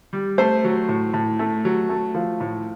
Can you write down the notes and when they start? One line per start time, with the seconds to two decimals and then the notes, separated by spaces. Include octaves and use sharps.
0.13 G3
0.38 A3 C5
0.64 F#3
0.89 A2
1.14 A2
1.39 A3
1.65 F#3
1.89 A3
2.15 F3
2.40 A2